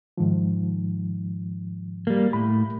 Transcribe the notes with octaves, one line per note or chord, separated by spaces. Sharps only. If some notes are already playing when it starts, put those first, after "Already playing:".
G#2 D#3 F3
G3 A#3
A2 B5